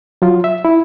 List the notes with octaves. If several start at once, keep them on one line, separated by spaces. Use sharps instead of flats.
F#3 F4
E5
E4